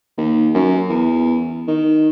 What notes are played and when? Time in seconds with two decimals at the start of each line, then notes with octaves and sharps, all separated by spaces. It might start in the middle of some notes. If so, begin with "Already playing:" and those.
0.18 D#2
0.54 F#2
0.89 E2
1.68 D#3